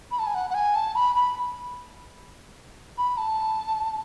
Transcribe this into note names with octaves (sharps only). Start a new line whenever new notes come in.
B5
A5
G#5
F#5
F#5
G#5
A5
B5
B5
B5
A5